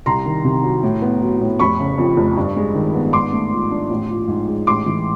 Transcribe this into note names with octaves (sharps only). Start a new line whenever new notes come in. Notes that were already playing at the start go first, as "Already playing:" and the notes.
C2 A#5 C6
D#3
C3
F#3
A2
B3
F#3
A2
F1 B5 C#6
C#3
F2
F1
G2
G#3
D#3
B3
G#2 C6 D6
A3
F3
D4
A1
F3
G#2
G#3
A1 C6 D6
E3